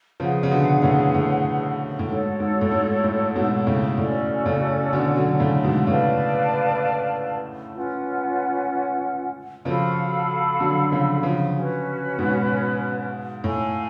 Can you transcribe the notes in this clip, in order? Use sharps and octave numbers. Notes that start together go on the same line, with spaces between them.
C#3 F3 G#4 B4 F#5
C#3
B2 D3
A2 C#3
A2
A2
G#2 F#4 A4 C#5
G#2
A2
G#2
A2
G#2 B2
A2 C#3
A2 C#4 F#4 A4 D5
A2 C#3
B2 D3
D3 F#3
A2 C#3
G#2 B2
A2 C#3 B4 D5 F5 A5
C#4 F4 B4 F#5
C#3 F3 F#4 A4 F5 B5
D3 F#3
C#3 F3
C#3 F3
C#4 F#4 B4
G#2 B2
A2 A4 F5 G#5